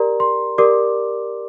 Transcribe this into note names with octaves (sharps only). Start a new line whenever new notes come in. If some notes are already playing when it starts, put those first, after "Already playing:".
Already playing: G4 A#4 D5 A#5
C6
G4 A#4 D5 D6